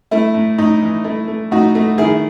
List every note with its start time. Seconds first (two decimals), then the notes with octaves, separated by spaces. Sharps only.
0.11 A3 E4
0.34 A2
0.58 A2 D#4
0.82 E3
1.04 A3 E4
1.28 A3
1.51 A2 D#4 F#4
1.75 A3
1.98 D#3 E4 G#4